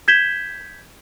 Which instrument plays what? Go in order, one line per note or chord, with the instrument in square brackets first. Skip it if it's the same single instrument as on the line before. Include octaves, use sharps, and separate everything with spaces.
[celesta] G6 G#6 B6 E7 G7